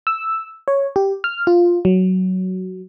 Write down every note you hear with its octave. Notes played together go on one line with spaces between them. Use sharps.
E6
C#5
G4
F6
F4
F#3